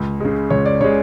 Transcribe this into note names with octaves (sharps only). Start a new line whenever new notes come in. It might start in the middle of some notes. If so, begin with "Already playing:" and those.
Already playing: C#2
C#3 G#3
C#2 C#5
D5
C#3 G#3 C#5